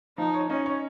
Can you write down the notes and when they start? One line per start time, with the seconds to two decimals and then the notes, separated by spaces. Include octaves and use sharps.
0.18 F3 D#4
0.34 C#5
0.50 C#4 D#4
0.66 C#5